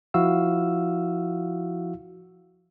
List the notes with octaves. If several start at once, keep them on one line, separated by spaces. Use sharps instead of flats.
F3 E4 F#4 F5 E6